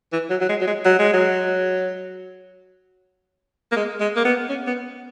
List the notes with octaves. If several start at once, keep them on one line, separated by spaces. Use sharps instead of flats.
E3
F#3
F#3
G#3
F#3
G#3
F#3
G#3
F#3
A#3
G#3
G#3
A#3
B3
C#4
B3